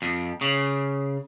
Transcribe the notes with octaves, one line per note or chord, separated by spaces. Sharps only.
F2
C#3